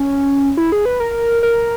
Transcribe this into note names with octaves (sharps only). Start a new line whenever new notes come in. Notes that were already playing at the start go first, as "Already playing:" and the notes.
Already playing: C#4
E4
G#4
B4
A#4
A#4